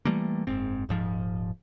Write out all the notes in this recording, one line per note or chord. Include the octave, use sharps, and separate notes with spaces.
E3 G3 A3 A#3
F#1 G#2 C4
D#1 G#2 F3